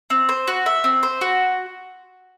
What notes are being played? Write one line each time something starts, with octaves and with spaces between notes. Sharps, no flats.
C4
C5
F#4
E5
C4
C5
F#4